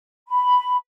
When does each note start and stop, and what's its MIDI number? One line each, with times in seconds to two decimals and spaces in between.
0.28 0.75 83